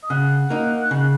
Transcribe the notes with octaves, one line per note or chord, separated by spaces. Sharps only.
D#5
C#3 F#5
A#3 D#4
C#3